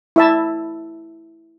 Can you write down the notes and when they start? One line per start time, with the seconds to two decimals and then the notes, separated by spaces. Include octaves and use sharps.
0.16 E4 E5 A5